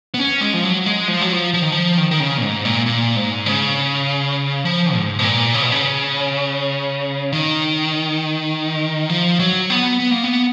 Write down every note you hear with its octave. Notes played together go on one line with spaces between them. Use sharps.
B3
C#4
G#3
F3
F#3
G#3
F3
F#3
F3
F3
D#3
F3
D#3
D#3
C#3
A#2
G#2
A#2
A#2
G#2
C#3
F3
G#2
B2
A#2
C#3
B2
C#3
D#3
F3
F#3
B3
B3
A#3
B3